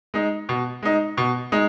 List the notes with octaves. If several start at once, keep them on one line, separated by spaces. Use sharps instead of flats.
G#3 D#4
B2
G#3 D#4
B2
G#3 D#4